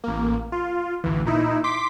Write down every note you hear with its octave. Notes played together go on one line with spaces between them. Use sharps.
A1 A#3
F4
A1 D2 E3
A#2 D#4 E4
C6 D6 B6